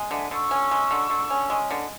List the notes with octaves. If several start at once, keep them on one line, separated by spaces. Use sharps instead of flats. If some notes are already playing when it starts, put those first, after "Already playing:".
Already playing: G#3
D3 E5 G#5
D3 C#6 E6
C#4
G#3
D3
D3
C#4
G#3
D3